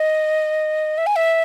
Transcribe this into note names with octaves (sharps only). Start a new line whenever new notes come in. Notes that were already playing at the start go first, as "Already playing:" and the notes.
Already playing: D#5
E5
G#5
E5